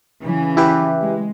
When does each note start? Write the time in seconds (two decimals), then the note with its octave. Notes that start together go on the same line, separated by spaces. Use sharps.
0.24 C#3 E3
0.57 E4 G4 B4
1.00 G#3